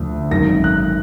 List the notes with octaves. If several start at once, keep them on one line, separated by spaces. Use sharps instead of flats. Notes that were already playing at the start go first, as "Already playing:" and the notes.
Already playing: D2 D3 F3
G#1 F#2 D#3 A#6
F#6